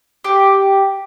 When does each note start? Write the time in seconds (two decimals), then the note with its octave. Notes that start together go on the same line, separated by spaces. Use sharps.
0.24 G4